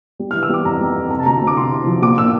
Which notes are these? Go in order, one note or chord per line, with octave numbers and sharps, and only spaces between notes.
G3
F6
E3
E6
G3 D6
F2 A#5
G3
F2
C3 A#5
A5
D2 A#5
D2
D6
C3 C6
C3
F3
A#1 D6
A#2 E6